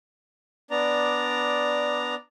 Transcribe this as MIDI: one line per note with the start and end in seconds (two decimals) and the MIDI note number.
0.71 2.15 59
0.71 2.15 62
0.71 2.15 74
0.71 2.15 82